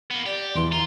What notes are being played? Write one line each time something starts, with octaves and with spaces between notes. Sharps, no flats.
A#3 B3
G4 D5
E2 E3 C6
F4 A#5